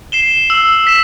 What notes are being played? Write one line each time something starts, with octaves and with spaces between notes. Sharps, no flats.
C7 E7 G7
E6
B6 E7